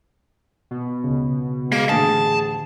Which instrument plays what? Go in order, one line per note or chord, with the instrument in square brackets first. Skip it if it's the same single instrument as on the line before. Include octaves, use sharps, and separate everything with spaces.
[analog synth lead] B2
[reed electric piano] C#2 C#3
[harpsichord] G#3 [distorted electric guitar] A#3
[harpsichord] A1 D2 [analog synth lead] G#4 [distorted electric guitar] A5